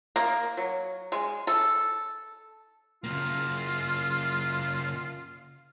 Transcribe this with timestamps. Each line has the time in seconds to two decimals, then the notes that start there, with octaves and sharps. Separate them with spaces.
0.16 A#3
0.57 F#3
1.12 G#3
1.47 A4
3.04 C#3 A#3 F4